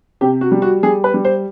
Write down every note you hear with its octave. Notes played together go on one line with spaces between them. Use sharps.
C3 G4
F#4
G3
F#4
G3 G#4
B4
G3
C5